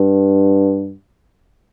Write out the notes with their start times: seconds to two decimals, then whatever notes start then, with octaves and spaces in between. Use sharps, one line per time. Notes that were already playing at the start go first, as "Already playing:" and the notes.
Already playing: G2